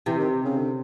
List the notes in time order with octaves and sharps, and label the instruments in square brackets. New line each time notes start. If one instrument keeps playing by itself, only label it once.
[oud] C3 [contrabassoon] E3
[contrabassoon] D#3
C#3
D3